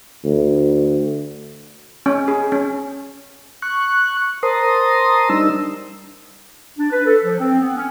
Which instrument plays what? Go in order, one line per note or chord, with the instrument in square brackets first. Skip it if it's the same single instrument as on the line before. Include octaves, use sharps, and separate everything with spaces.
[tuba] D2
[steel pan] C#4
G#4
C#4
[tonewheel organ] C#6 F#6
A#4 C5 A5 A#5 C6 D#6
G3 D4 D#4 E6
[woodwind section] D4
B4
A4
F3
C4
B3
C#4